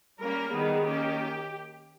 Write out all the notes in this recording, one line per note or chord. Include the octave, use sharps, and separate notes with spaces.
G3 A#3 C#4 A#4
D#3 G3 B3 G#4
D#3 A#3 C#4 G4